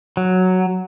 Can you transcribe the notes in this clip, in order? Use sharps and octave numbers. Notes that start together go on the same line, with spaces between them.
F#3